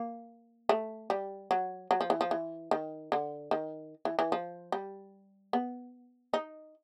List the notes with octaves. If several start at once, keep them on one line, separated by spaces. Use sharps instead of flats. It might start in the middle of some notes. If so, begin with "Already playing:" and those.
Already playing: A#3
A3
G3
F#3
F#3
F3
E3
F3
E3
D#3
D3
D#3
E3
E3
F3
G3
B3
D#4